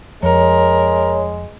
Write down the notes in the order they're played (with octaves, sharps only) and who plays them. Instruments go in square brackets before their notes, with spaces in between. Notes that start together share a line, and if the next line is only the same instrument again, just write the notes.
[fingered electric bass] F2 [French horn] G#3 [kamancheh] A#4 [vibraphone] C#5